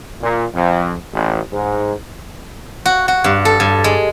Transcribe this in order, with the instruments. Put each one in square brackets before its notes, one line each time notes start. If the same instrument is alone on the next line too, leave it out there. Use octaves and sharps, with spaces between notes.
[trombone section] A#2
F2
A1
G#2
[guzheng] F#4
F#4
G2
A4
G2
G#3